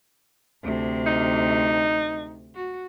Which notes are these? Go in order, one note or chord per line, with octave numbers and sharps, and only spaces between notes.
D2 C3
D#4
F#4